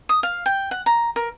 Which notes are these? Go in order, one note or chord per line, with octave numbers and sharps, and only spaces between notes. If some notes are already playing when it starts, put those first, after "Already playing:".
D#6
F5
G5
F#5
A#5
A#4